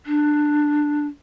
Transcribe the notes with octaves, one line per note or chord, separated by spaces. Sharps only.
D4